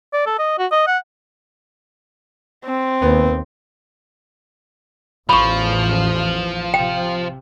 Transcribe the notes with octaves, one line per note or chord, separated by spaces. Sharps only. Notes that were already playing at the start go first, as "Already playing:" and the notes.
D5
A4
D#5
F#4
D#5
F#5
C4
D#2 B3
A1 E2 E3 F3 B5 C#6
C3 G5